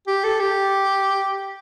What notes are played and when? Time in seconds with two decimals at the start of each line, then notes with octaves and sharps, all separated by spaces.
0.07 G4
0.24 A4
0.40 G4